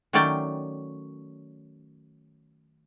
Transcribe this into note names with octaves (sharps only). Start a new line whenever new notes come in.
D#3 F#3 A3 C#4 D5 G5